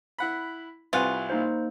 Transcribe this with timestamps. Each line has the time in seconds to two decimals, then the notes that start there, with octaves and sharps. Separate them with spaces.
0.18 E4 F#5 B5
0.93 C2 C3 E3 F4 F#5
1.30 A#3 D#4 C5